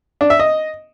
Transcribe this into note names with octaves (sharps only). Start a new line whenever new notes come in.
D4
E5
D#5